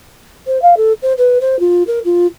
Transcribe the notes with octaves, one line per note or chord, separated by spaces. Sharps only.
C5
F5
A4
C5
B4
C5
F4
A#4
F4